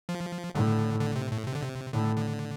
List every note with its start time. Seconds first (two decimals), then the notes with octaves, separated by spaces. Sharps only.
0.09 F3
0.54 A2 D3
1.00 D3
1.16 C3
1.32 A2
1.47 C3
1.55 D3
1.63 C3
1.93 A2 D3
2.16 D3